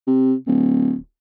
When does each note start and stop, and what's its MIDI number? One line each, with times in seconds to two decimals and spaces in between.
0.07 0.34 48
0.47 0.95 26